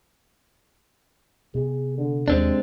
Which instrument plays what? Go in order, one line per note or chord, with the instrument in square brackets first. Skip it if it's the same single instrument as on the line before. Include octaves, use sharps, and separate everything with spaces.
[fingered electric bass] C3 B3 [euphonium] G#4
[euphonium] D3
[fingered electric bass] D#2 [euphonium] C3 [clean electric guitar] G#3 C4 D4